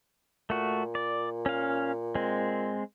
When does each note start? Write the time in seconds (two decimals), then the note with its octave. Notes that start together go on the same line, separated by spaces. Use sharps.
0.50 A#2 A3 F#4
0.95 D5
1.46 C#4 F5
2.15 G#3 C4